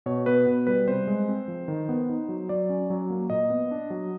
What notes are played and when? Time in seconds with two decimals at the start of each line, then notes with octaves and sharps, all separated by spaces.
0.06 B2 C#5
0.26 B3 B4
0.47 B2
0.67 G3 B4
0.87 C3 C5
1.07 G#3
1.28 C4
1.48 F3
1.68 D#3
1.89 B3
2.09 D#4
2.29 F#3
2.49 F#3 D5
2.69 C#4
2.90 F#3
3.10 A#3
3.30 A#2 D#5
3.50 B3
3.71 D4
3.90 F#3